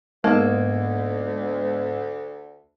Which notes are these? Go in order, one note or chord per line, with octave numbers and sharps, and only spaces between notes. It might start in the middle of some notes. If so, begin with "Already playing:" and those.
D2 G#2 A#3 B3 D#5 A5 G#6